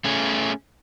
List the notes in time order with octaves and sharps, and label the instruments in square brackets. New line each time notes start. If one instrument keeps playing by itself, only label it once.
[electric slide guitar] A3 C#4 G#4